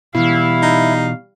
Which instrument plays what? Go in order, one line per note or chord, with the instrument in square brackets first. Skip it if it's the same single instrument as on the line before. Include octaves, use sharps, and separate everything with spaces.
[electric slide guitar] B2 E3 [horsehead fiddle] G3 F5 [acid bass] E4
[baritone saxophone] D#4